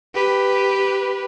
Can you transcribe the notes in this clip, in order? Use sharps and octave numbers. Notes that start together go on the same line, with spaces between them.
G4 B4